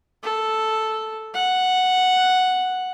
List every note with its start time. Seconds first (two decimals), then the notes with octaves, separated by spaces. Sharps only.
0.23 A4
1.34 F#5